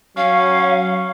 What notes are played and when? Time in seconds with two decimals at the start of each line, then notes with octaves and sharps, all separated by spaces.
0.17 F#3 C#4 F5